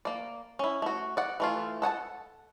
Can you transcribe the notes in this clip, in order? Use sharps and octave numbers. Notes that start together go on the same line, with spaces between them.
A#3 D5
C#4 E4
A3 F#4
D5 F#5
E3 A3 F4
A4 F#5 G#5 A5